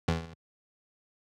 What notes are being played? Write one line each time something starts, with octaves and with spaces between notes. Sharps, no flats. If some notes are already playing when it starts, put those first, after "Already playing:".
E2